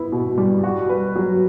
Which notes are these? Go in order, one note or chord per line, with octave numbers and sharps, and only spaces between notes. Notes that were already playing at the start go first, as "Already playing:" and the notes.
Already playing: B3 E4
B2
G3
F#4
B4
F#3